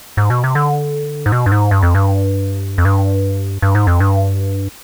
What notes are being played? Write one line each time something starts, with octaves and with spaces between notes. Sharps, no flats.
G#2
B2
C3
D3
G#2
B2
G2
G#2
G2
F2
G2
F2
G2
G2
G#2
F2
G2